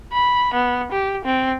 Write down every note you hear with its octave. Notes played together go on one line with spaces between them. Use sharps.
B5
B3
G4
C4